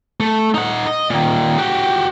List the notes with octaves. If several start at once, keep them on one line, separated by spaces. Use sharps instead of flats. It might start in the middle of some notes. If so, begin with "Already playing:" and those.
A3
D#4 F#5
D#5
A#2 D#3
F#4 G4